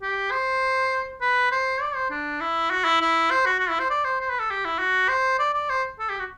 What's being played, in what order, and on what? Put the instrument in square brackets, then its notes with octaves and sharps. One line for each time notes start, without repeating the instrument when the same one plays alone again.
[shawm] G4
C5
B4
C5
D5
C5
D4
E4
F#4
E4
E4
C5
F#4
F#4
E4
C5
D5
C5
C5
B4
A4
G4
E4
F#4
C5
D5
D5
C5
A4
G4
F#4